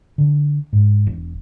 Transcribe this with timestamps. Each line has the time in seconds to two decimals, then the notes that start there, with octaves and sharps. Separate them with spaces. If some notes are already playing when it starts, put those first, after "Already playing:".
0.18 D3
0.73 G#2
1.07 E1